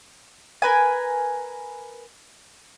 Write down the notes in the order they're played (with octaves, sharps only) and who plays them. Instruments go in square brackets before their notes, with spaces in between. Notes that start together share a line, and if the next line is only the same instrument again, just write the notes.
[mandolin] A#4 B4 G#5